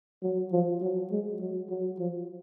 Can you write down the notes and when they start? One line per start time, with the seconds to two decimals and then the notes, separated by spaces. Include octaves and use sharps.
0.23 F#3
0.52 F3
0.82 F#3
1.11 G#3
1.41 F#3
1.70 F#3
1.99 F3